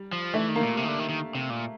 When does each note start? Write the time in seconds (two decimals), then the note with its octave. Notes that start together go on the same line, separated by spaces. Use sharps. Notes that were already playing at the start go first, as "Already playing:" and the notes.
Already playing: G3
0.13 F3
0.34 E3 A3
0.49 D#3
0.56 A#3
0.63 A#2
0.77 C3
0.84 D#3
0.88 D3
0.99 D#3
1.09 D#3
1.35 C3
1.50 A#2